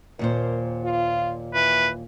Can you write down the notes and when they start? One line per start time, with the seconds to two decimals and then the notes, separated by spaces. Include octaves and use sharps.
0.19 D#2 A#2 A#4 C5
0.84 F4
1.54 E3 B4